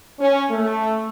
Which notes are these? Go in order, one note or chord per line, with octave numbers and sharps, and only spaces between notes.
C#4
A3